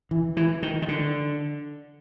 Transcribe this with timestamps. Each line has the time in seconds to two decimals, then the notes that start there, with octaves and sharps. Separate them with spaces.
0.11 E3
0.37 E3
0.63 D#3
0.82 D#3
0.88 D3